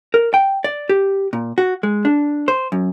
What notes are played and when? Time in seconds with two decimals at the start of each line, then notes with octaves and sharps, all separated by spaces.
0.14 A#4
0.34 G5
0.64 D5
0.89 G4
1.33 A#2
1.58 F#4
1.83 G#3
2.05 D4
2.48 C5
2.72 F#2